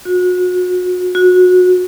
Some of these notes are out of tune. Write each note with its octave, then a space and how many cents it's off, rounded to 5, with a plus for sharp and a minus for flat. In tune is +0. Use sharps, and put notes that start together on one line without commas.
F#4 -35
F#4 -25